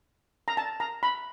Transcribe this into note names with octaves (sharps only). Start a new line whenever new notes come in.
A#5
A5
A#5
B5